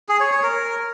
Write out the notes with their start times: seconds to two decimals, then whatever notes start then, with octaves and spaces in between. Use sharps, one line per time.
0.09 G#4
0.20 C#5
0.32 C#5
0.43 A#4